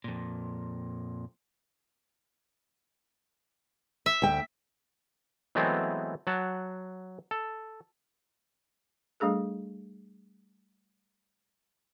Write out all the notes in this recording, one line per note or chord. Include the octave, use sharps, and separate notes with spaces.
F2 A#2
E5
D2 G5
E3 F#3 G#3 A3 B3 C4
F#3 F#5 A5
A4
G3 A3 D4 G#4 A4